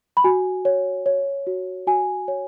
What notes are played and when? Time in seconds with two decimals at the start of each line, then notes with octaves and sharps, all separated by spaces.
0.17 B5
0.24 F#4 G#5
0.65 C#5
1.06 C#5
1.47 F#4
1.87 F#4 G#5
2.28 C#5